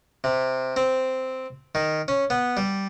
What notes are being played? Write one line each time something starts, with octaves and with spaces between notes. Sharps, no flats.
C3
C4
D#3
C#4
B3
G3